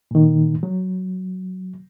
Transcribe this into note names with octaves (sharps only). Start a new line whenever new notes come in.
A#2 D#3
F#3